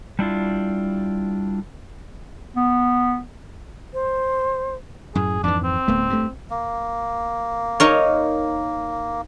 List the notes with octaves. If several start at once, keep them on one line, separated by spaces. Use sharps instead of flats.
G3 D4 E4 F4
B3
C5
F#2 A2 G#4
F2 G#2 E3 D4
C4
D1 A3 B3
G2 A3
A#3
D#4 A#4 C#5